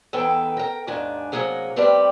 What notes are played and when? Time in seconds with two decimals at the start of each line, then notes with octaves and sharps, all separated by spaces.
0.13 E2 D#3 B3 A4 G5 G#5
0.57 A#4 G5
0.87 D#2 G#2 D#3 D4 G#5
1.32 C3 F3 F#3 A#3 G#4 F#5
1.76 G3 A3 C4 G4 B4 D5